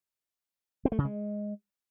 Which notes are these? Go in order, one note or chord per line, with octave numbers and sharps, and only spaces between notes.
C4
A3
C#3
G#3